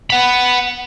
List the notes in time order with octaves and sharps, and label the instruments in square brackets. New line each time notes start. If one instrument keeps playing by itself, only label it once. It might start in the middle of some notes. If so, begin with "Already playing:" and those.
[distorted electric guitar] F#5 B5